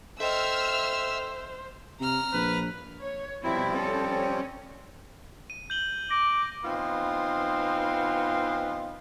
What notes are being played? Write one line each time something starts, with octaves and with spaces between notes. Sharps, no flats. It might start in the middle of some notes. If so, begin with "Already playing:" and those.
A4 C5 D#5 E5 G5 E6 F6
C3 A#5 F6
A#1 B4
C#5
B2 F3 G3 C4 E4
C#4 A4
C#4
D#7
G6 F#7 G7
D6 A#6
E3 B3 C4 D#4 F4